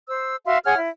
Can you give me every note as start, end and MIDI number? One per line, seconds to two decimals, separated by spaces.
0.07 0.36 72
0.07 0.36 88
0.46 0.57 66
0.46 0.57 76
0.46 0.57 77
0.46 0.57 84
0.64 0.76 68
0.64 0.76 73
0.64 0.76 78
0.64 0.76 89
0.77 0.88 64